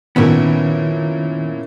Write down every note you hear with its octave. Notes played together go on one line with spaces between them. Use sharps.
F#1 A#2 D#3 B3 C#4 E4 A#4